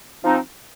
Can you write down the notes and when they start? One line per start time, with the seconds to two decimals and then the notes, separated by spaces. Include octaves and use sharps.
0.24 F3 C4 D#4